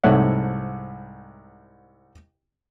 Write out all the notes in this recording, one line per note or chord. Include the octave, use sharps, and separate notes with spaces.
C2 G#2 A3 C#5 E5 F#5